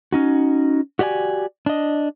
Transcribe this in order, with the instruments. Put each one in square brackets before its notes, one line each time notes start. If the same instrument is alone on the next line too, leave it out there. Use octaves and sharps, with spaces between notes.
[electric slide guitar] C#4 D#4 F#4
F#4 G4 D5 D#5 G#5
D4 D#5